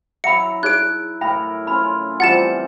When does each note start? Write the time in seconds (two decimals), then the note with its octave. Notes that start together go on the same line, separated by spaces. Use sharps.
0.24 F#3 E4 E5 F#5 B5 C#7
0.63 D#4 G#4 C#5 F#6 D7
1.21 A2 A4 A#4 E5 G5 B5
1.67 C#4 F4 B5
2.20 C3 E3 G3 F4 F#5 A5 A6 E7